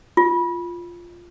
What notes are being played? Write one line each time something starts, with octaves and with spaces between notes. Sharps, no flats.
F4